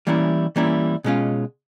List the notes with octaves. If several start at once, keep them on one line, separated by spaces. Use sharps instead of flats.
E3 G3 A#3 C#4 E4
E3 G3 A#3 C#4 E4
B2 G#3 C#4 F4